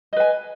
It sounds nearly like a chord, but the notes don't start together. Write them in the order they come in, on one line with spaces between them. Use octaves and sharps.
D#5 B4 G#5